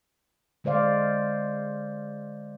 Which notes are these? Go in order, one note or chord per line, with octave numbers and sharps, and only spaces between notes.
D3 G#3 C5 D5 F5